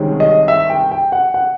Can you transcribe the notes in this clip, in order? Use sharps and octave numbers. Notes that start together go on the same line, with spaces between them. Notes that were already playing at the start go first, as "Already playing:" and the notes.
Already playing: C2 C3 D#3 G#3 C#4
D#5
E5
G5
G5
F#5
F#5